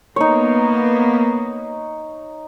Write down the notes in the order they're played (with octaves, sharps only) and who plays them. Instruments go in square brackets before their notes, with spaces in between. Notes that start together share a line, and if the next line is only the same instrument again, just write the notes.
[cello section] A#3 B3 [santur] D#4 C#5